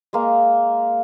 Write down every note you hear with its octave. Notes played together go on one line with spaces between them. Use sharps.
G#3 A#3